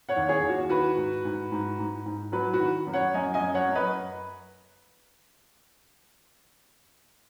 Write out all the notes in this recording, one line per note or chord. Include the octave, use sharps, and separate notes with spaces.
C#5 F#5
D#2
G#4 C#5
D#2
F#4
D#3 F#4 B4
G#2
G#2
G#2
G#2
G#2
F#3 F#4 B4
F#4 B4
D#3
F#2
C#5 F#5
F#2 D#5 G#5
D#5 G#5
F#2
C#5 F#5
F#2
B4 D#5